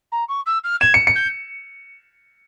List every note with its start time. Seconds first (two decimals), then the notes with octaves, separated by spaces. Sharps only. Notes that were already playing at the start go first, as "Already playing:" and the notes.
0.12 A#5
0.28 C#6
0.46 E6
0.64 F6
0.81 G#6 E7
0.94 C#7
1.07 C#7
1.15 G6